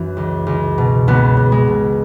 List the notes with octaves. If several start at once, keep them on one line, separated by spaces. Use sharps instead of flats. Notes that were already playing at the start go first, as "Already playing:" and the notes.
Already playing: F#2 E3 C#4
C#2
C#2
B2
C#2 B3
C#2
G#3
B2